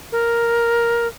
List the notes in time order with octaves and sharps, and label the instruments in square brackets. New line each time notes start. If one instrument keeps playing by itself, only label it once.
[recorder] A#4